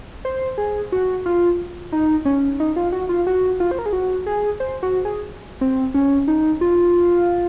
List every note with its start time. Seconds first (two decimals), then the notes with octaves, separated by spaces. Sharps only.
0.25 C5
0.58 G#4
0.92 F#4
1.26 F4
1.92 D#4
2.25 C#4
2.60 D#4
2.76 F4
2.92 F#4
3.09 F4
3.27 F#4
3.60 F4
3.71 C5
3.79 A#4
3.86 G#4
3.93 F#4
4.26 G#4
4.60 C5
4.83 F#4
5.05 G#4
5.61 C4
5.94 C#4
6.28 D#4
6.61 F4